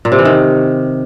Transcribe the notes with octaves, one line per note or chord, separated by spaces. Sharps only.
A#2
C3
E3
D#3